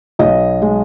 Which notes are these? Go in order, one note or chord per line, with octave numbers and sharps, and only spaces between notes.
B1 D#5
G#3